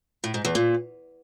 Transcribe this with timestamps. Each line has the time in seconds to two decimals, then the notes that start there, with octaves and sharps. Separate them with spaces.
0.24 A2
0.34 G#2
0.45 E2
0.55 A#2